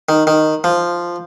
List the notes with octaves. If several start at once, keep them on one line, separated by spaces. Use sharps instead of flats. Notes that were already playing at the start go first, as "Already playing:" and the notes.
D#3
D#3
F3